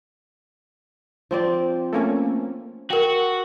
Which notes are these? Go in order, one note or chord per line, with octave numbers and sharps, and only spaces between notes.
F3 C4 D5
A3 A#3 C#4
F#4 A#4 G5